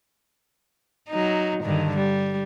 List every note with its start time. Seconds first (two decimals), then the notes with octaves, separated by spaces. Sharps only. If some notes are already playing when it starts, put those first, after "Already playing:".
1.09 F#3 D#4
1.63 G2 D3 D#3
1.96 G3